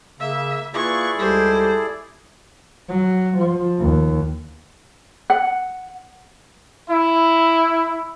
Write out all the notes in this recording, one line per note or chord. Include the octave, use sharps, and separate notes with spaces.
C#3 A#3 E5 E6
A#3 E4 F4 G#4 B4 D5 C#6
C#2 G3 G4 A4 C5
F#3
F3
D#2
F#5
E4